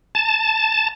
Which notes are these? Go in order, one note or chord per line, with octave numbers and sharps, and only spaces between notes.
A5